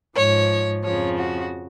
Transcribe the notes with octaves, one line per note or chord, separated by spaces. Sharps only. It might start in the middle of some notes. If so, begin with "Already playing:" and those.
G#2 F3 C#5
F2 C#3 F3 C#5
F#4